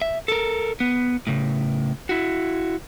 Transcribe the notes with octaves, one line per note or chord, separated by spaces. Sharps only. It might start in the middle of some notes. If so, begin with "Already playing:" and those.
E5
A4 A#4
B3
A2 C#3
E4 F#4